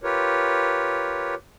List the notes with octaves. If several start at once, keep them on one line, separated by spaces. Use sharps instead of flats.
F4 G4 A#4 B4 C#5